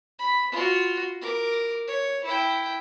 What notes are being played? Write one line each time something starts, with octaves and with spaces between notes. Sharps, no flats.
B5
F4 F#4
A#4 D6
C#5
E4 G5